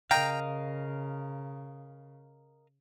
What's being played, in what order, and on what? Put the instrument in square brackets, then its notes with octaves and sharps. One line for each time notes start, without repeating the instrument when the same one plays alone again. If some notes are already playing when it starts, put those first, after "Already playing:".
[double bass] C#3 [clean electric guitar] A#4 D#5 F5 [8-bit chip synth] G5 A#5